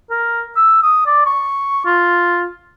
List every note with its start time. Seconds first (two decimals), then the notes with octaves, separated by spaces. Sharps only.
0.10 A#4
0.56 E6
0.83 D#6
1.06 D5
1.26 C#6
1.86 F4